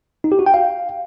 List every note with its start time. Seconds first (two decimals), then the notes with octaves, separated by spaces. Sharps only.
0.24 D#4
0.32 G4
0.39 F#4
0.46 G5
0.54 F5